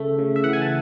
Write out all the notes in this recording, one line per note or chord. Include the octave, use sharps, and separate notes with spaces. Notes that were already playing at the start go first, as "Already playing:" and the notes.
Already playing: C#3 A3 E5
C#3
E5
E3 F#5
G#5
A5